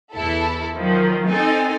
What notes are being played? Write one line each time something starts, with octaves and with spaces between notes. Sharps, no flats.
E2 E4 A4
D#3 F3 F#3
C4 D#4 A4 G#5